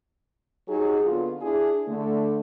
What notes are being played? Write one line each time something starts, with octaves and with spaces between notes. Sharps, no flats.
F#3 D#4 G4 G#4
D3 B3 F4
D4 E4 G#4
D3 A3